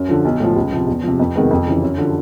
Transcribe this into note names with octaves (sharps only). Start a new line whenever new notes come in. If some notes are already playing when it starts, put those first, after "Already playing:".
Already playing: F#2
D3 F3
B1
A2 F3
C#2
C3 F3
E2
C3 F3
F2
C3 D#3 G#3 B3
F2
C#3 E3
F#2
D3 F3